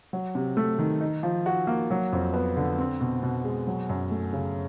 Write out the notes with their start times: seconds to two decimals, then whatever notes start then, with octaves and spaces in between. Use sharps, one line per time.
0.13 F#3
0.35 C3
0.57 A3
0.79 D#3
1.01 D#4
1.23 F3
1.46 F#4
1.67 A#3
1.90 F#3
2.13 F2
2.34 B3
2.57 D3
2.78 C4
3.00 B2
3.23 B2
3.44 G#3
3.67 F#3
3.89 F#2
4.11 A3
4.33 C#3